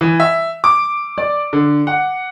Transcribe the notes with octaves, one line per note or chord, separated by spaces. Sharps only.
E3
E5
D6
D5
D3
F#5